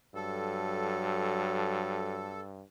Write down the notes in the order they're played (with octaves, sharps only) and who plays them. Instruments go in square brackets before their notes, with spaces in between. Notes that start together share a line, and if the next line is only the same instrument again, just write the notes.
[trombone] G2 [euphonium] F#3 [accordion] A4